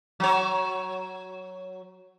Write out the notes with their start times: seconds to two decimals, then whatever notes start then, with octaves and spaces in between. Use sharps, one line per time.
0.20 F#3 C#5